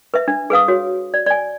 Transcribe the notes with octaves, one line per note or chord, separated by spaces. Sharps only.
B4 E5
D4
G#4 B4 F5 D#6
F#4 C#5
D5
D5 G#5